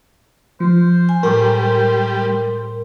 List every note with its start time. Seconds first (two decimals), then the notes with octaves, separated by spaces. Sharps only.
0.60 F3 C5
1.09 G#5
1.23 A2 G3 A#4 D6